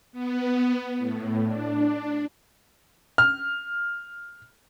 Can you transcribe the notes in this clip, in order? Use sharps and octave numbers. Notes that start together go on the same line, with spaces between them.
B3
A2
D4
F6